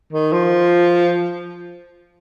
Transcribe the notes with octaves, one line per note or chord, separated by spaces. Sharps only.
D#3
F3